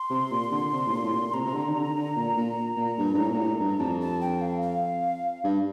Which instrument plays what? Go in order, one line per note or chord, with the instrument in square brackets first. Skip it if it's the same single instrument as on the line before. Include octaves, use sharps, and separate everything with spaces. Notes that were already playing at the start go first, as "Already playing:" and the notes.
Already playing: [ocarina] C6
[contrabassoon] C3
A#2
D3
C3
A2
A#2
A2
A#2
[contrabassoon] C3 [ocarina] A#5
[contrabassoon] C3
D3
D#3
D3
D3
A#2
A#2
A#2
G2
G2
A2
A#2
A2
G2
[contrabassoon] F2 [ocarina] A5
[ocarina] A5
G5
F5
F5
[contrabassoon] G2